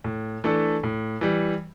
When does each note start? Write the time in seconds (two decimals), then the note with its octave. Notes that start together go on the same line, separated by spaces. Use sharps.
0.04 A2
0.44 E3 A3 D4 A4
0.83 A2
1.21 E3 G3